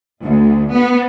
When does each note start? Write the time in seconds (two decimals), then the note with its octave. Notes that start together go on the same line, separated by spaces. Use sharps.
0.23 D2
0.73 B3